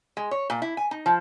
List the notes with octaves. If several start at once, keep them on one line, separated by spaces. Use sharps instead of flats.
G#3
C#5
A#2
E4
G#5
D#4
F3